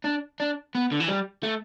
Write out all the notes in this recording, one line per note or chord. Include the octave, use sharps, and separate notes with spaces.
D4
D4
B3
D3
E3
G3
A3